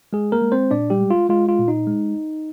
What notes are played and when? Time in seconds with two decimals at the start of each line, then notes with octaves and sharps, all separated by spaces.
0.13 G#3 G#4
0.32 A#3 A#4
0.42 G#3
0.52 C4 C5
0.71 A#2 D4 D5
0.90 G3 G4
1.00 G#3
1.11 F4
1.29 G#3 F4
1.49 F4
1.59 A#2
1.68 D#4
1.87 G#3